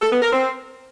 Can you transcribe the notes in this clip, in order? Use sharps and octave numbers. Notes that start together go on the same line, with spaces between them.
A4
B3
A#4
C4